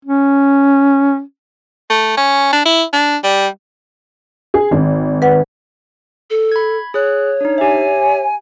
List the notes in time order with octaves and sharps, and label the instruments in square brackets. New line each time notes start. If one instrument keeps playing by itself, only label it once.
[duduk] C#4
[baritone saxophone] A3
C#4
D4
E4
D4
G3
[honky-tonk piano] G#4
G#1
[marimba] B4 F#5
[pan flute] A4
[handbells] B5 G#6
[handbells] G#4 F#6 [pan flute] C#5
[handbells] D4 D#4
[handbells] G4 E5 [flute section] G#5